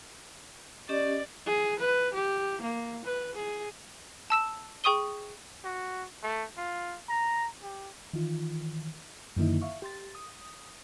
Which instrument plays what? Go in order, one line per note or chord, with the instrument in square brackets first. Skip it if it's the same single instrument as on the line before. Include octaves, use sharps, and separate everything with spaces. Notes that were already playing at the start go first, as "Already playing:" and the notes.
[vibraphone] C#4 G4 D#5 [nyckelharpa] D5
[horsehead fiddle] G#4
B4
G4
A#3
B4
G#4
[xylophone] A5 E6 E7
G#4 G5 C#6 D#6 D#7 G7
[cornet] F#4
A3
F4
A#5
G4
[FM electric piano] D#3 E3 F4
F#2 D3 D#3 A#3 D#4 E4
E5 F5 C#6
G4 C6 A6
D#6